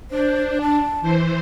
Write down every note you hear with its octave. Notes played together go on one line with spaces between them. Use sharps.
D4 C5
A5
E3 C5